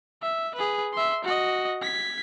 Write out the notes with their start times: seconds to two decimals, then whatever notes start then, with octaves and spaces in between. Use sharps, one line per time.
0.22 E5
0.55 G#4 B4
0.93 E5 C6
1.25 F#4 D#5
1.82 G#6 B6